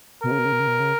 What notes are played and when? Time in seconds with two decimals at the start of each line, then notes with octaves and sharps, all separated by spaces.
0.23 B2 A#4
0.31 C#3
0.38 B2
0.45 C#3
0.52 B2
0.60 C#3
0.67 B2
0.80 C#3